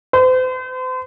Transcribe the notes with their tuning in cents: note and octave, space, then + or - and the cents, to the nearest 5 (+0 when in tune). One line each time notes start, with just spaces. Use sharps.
C5 -40